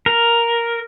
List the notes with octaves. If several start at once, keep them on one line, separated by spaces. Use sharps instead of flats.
A#4